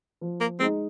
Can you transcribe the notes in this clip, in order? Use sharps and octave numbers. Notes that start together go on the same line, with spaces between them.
F3
A#3
G#3 C4 D#4